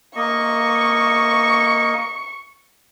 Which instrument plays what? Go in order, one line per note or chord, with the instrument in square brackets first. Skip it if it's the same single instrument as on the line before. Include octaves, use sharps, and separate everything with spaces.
[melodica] A#3 D#5 [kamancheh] C#6